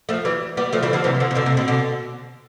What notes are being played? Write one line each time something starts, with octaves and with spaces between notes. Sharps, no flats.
F3 A3
E3 G3
G3 B3
F3 A3
E3 G3
D3 F3
C3 E3
D3 F3
C3
B2 D3
C3
B2 D3
B2 D3